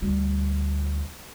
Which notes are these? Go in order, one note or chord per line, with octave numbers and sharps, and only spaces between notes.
D2 G3